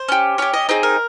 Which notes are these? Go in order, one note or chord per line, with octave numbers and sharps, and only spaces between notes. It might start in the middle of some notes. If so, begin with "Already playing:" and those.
Already playing: C5
C#4 G4
C#4 G4 C#5
D#5
C4 D#4 G#4 C#5
A#4